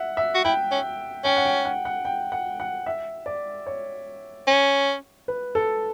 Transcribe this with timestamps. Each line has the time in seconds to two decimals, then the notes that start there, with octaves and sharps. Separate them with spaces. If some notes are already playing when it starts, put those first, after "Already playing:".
Already playing: E5 F#5
0.17 E5
0.35 F#4
0.45 E4 G5
0.71 C#4
1.24 C#4 G5
1.37 F#5
1.45 G5
1.65 F#5
1.85 F#5
2.05 G5
2.32 F#5
2.60 F#5
2.86 E5
3.26 D5
3.66 C#5
4.47 C#4
5.28 B4
5.55 A4